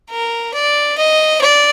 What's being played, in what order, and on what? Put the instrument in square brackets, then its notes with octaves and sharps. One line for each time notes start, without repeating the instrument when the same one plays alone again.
[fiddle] A#4
D5
D#5
D5